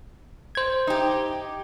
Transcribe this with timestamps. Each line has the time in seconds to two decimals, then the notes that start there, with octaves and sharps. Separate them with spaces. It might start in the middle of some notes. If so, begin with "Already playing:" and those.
0.55 C5 G#6
0.87 D#4 G4